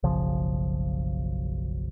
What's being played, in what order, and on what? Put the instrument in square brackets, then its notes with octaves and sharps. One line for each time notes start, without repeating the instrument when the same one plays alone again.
[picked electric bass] F#1 B1 C#3 F3